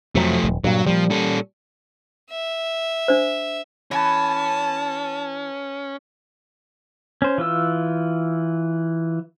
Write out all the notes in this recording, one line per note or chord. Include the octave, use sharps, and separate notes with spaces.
F2 C3 F3 F#3 A3
D#1 B1
G2 A#2 F#3
A#2 F3 G3
C#4 A4
E5
D4 C5
E3 C#4 A5
C#4 C5
E3 F4 E6